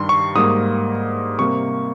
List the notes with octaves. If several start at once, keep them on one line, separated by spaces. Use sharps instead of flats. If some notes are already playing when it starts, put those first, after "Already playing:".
Already playing: G2 D#3 G3 C6
C#6
G#2 G3 A#3 D#6
C3 G3 A#3 C#6